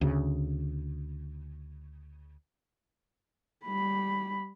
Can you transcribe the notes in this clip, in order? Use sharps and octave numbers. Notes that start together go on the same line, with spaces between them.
D2 C#3
G3 B5